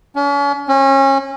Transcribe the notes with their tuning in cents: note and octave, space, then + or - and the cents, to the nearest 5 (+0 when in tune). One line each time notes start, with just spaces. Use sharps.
C#4 +40
C#4 -30